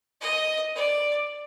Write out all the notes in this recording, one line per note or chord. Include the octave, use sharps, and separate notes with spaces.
D#5
D5